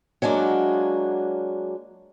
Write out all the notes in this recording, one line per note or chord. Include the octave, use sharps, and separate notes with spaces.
F#3 G#3 A#3 D4 F#4